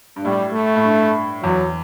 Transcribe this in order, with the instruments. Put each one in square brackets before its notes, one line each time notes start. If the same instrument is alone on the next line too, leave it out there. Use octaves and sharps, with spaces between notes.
[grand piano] G2
[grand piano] A2 [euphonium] G3
[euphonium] A3
[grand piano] A2
G2
[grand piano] E2 [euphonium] F#3